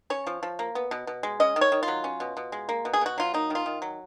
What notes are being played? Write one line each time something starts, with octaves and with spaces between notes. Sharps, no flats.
C#4 C#5
F3
F3
A#3
B3
B2
B2
G#3
C#4 D#5
D#3
C#5
D#3
F4
F#3
C#4
B2
B2
G#3
A#3
B2
G#4
B2 F#4
F#3 F4
A#3 D#4
D#3 F4
D#3
F#3